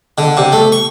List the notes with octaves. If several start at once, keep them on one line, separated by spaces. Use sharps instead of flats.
D3
C3
A3
C#6